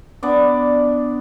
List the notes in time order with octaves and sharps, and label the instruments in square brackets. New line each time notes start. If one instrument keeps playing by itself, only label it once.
[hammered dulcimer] B3 D4 D5